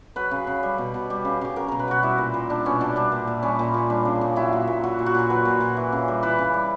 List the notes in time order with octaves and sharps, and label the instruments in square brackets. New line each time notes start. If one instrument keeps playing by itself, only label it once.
[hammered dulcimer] F#3 B4
C#3
C#3
G3
B2
B2
G3 G4
C#3
C#3 G4
F#3 A#4
B2 A#4
B4
B2 F#4
G3 E4
A#2
A#2
G3 D4
B2 C#4
B2 D4
G3 D4
A#2
A#2
G3 C#4
A#2
A#2
G3 D4
C#3
C#3
F#3 E4
A#2
A#2
F#3 F#4
A#2
F#4
A#2
F#3 B4
A#2
A#2
E3
C#3
G3
E3 B4
C#3
G3